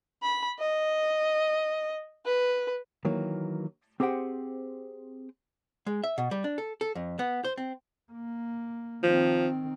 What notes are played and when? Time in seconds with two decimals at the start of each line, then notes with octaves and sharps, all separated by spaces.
0.22 B5
0.59 D#5
2.26 B4
3.05 D#3 E3 F#3 A#3
4.00 C4 G4 G#4 C5 F#5 G5
5.86 G#3
6.04 E5
6.18 B2
6.31 G3
6.44 D4
6.58 A4
6.81 A4
6.95 F2
7.19 B3
7.44 C5
7.57 C4
8.12 A#3
9.04 D#3 F3 C4